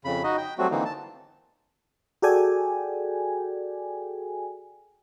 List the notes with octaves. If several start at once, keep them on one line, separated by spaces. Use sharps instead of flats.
F2 C#3 B5
D#4 F#4 D#5
G5
F#3 G3 A3 C4 F#4
D3 E3 A#3 C4 D#4
A5
F#4 G#4 A4 D5 G5 G#5